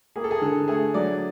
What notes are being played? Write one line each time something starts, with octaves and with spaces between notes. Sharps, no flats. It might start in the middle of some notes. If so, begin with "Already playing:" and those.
A#3 G#4
A4
G#4
D3 A4
A3 G#4
F#3 D5